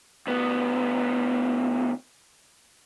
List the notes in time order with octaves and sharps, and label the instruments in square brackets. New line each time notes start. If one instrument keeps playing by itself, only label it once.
[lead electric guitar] D2 B3